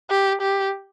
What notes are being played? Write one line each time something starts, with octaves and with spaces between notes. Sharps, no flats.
G4
G4